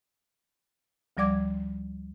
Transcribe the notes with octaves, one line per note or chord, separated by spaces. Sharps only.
D2 F3 G3 D5 D6 G#6